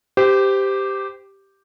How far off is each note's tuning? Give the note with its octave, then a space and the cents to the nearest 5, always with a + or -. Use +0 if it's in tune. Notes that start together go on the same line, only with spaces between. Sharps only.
G4 +0 C5 -25